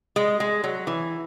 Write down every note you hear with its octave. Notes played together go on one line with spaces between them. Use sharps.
G#3
G#3
F#3
E3